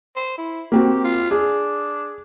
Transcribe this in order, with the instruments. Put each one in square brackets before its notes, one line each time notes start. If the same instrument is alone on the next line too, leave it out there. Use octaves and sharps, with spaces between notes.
[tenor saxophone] C5
E4
[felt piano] A#3 C4 F#4 [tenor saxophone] G4
[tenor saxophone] F4
[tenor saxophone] D4 [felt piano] G#4